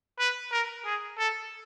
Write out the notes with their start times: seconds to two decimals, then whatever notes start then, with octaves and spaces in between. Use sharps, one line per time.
0.19 B4
0.52 A#4
0.85 G#4
1.18 A4